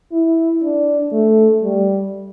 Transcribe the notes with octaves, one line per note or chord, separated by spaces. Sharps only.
E4
D4
A3
G3